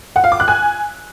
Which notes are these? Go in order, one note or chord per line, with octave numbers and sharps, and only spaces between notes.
F#5
F5
D6
F#6
G#5